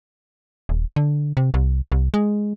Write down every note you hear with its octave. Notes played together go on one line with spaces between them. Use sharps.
D#1
D3
C3
C2
C2
G#3